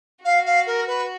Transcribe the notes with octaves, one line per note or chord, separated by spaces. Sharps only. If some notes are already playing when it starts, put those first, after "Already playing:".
F#4 F5
F5
A#4
B4